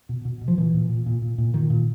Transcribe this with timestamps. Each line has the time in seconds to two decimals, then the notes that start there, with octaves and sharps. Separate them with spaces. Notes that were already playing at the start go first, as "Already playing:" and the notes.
0.09 B2
0.25 B2
0.41 B2
0.48 F3
0.57 A#2 E3
0.74 A#2
0.89 A#2
1.06 A#2
1.22 A#2
1.38 A#2
1.54 A#2 D#3
1.70 A#2